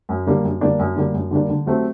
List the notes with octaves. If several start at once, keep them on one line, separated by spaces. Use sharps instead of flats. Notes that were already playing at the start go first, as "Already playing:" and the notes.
F#2
D3 G3 A#3 D4
F#2
D3 G3 A#3 D4
F#2
D3 G3 A#3 D4
F#2
D3 G3 A#3 D4
D3
F#3 A3 C4 G4